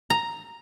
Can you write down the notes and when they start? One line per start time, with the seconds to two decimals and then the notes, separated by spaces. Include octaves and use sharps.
0.10 A#5